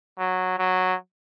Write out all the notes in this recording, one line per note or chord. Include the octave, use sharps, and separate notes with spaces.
F#3
F#3